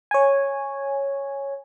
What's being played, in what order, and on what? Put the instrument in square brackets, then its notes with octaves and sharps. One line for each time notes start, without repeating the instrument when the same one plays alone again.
[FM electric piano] C#5 G#5